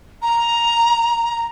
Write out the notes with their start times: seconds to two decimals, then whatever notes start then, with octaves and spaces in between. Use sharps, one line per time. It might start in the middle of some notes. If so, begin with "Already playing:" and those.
0.22 A#5